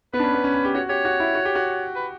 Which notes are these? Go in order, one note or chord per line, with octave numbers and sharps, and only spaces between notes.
B3 B4
D4
C#4
B3
C#4
C#4
G4
F#4 C#5
G4 C#5
F#4
E4
F#4
G4
F#4
B4